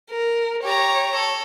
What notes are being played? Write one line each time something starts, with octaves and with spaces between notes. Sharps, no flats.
A#4
G4 C#5 A#5
A4